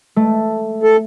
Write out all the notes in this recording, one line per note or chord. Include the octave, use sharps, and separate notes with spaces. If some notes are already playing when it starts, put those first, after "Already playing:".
A3
A4